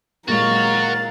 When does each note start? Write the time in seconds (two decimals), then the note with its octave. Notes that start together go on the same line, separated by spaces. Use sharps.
0.28 A#2 G#3 F#4 A#4 C#5 F5 A6